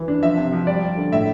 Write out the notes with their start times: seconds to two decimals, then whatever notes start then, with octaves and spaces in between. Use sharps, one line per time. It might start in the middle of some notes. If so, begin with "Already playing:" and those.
Already playing: E3
0.08 D4
0.22 F3 E5
0.38 C3
0.52 F3
0.67 G3 D5
0.82 G3
0.97 D3
1.12 A2 E5